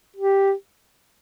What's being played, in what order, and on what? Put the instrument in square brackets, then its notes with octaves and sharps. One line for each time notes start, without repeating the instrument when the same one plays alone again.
[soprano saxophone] G4